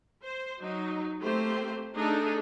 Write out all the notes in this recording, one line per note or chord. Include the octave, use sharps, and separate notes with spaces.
C5
F#3 D#4
A3 A#3 C4 G4 C5
A3 D4 D#4 G#4 A4